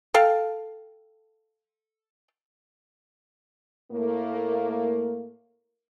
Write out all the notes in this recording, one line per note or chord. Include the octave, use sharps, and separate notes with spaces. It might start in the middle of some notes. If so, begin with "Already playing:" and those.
A4 F5 G5
A2 A3 A#3